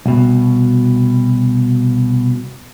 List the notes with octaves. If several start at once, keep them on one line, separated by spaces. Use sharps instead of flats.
C2 B2